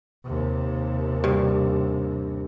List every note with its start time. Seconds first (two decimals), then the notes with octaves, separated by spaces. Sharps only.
0.24 D#2 C3
1.24 G2